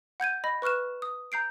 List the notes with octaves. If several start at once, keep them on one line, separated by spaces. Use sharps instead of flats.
F#5 G6 G#6 D#7
D#5 B5 A#6
B4 C#6 F6 F#6 E7
D#6
A#5 G6 C7 D7